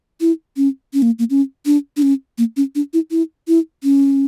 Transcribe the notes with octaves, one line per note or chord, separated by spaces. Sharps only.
E4
C#4
C#4
A#3
A#3
C#4
D4
D4
C#4
A#3
C#4
D4
E4
E4
E4
C#4